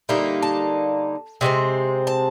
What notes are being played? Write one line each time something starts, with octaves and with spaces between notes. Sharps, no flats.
D3 G3 A#3 D#4 E5
A5
C3 D#3 G#3 C4
A5